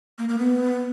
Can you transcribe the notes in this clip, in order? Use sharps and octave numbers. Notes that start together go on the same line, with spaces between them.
A#3
A#3
B3